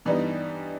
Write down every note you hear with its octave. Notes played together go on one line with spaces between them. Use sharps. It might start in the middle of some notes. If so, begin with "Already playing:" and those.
G2 E3 G3 B3 D#4